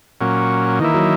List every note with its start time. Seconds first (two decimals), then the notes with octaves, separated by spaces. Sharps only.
0.21 A#2 F#3 C#4
0.79 D#3 E3 A#3 E4
0.94 F#3